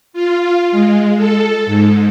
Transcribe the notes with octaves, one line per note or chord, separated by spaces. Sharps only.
F4
G#3
A4
G#2